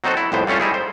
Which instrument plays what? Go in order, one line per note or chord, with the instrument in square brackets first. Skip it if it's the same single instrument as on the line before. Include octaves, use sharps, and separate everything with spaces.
[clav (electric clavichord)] F#3 C4 D#4 F#4 A4 C5
E4
C2 F2 A2 B3 C5
G3 A3 C#4 F4 A4
G3 D#4 E4 G#4
C5